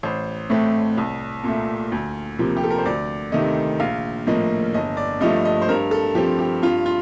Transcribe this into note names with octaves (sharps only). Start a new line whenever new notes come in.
A1 C5
A2 A3 C4
C2
A#2 A3
D2
C3 F3 A#3
G4
A4
A#4
C5
D2 D5
C3 D#3 A3 D#5
A#1 F5
A2 F3 A#3 D#5
G1 D#5
D5
G2 F3 A3 D#5
D#5
C5
G2 A#4
A4
F3 C4 G4
G4
G2 F4
F4